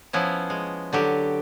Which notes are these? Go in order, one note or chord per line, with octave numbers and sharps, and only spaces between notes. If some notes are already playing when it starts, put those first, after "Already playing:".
F3 B3 C#4 E4
G#3
D3 F#3 G4